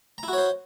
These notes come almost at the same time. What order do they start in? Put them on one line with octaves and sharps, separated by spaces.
A#5 E4 F#4 C#5 C5